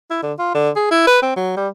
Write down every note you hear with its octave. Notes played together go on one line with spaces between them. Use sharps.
E4
D3
F4
D3
G#4
E4
B4
C4
F#3
G3